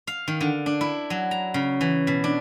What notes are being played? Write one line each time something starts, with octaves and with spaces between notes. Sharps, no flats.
F5
D#3
D3
D4
E4
F#3
A#5
C#3
E3
B2
D4